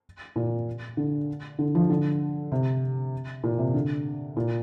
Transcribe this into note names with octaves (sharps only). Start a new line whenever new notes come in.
A#2
D3
D3
F3
D3
C3
A#2
C3
D3
A#2